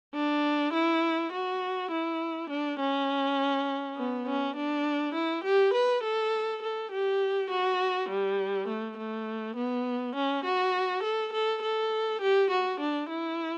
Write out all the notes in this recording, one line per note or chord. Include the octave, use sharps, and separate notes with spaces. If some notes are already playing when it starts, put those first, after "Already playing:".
D4
E4
F#4
E4
D4
C#4
B3
C#4
D4
E4
G4
B4
A4
A4
G4
F#4
G3
A3
A3
B3
C#4
F#4
A4
A4
A4
G4
F#4
D4
E4